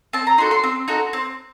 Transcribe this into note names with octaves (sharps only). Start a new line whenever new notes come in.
C4 A5
A#5
D#4 F#4 A4 C6
C6
C4
D#4 F#4 A4
C4